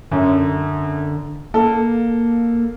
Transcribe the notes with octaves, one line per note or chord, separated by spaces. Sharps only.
F#2 D3
A#3 A4